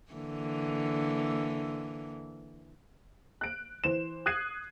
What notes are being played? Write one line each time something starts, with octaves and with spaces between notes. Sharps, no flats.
D3 E3 A#3
F#6 D7
E3 C5 E7
D#6 F#6 G#6 C7 D#7